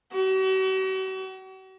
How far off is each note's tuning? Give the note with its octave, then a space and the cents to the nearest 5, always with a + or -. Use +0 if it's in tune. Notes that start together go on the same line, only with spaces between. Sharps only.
F#4 +45